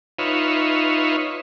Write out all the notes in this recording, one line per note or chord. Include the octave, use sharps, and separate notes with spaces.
D#4 F4 B4 C#5 E5